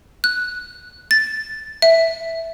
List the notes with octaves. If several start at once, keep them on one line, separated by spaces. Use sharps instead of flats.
F#6
A6
E5